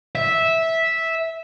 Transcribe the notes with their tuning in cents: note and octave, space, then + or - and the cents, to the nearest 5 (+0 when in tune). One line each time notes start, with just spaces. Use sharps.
E5 -10